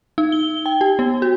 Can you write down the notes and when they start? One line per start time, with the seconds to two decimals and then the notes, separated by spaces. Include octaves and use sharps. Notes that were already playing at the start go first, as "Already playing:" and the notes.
0.18 D#4
0.32 G7
0.66 G5
0.81 G4
0.99 B3
1.22 F#4